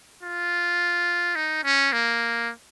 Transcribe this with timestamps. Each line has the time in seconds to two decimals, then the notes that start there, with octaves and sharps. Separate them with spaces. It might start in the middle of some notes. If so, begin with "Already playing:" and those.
0.23 F4
1.35 D#4
1.64 C#4
1.92 A#3